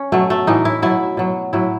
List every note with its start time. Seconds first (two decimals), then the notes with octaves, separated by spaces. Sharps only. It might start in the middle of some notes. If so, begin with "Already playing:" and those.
Already playing: C#4
0.12 B2 F#3 A3
0.30 A3
0.47 A2 E3 D#4
0.65 E4
0.82 B2 F#3 E4
1.17 B2 F#3
1.53 A2 F#3 E4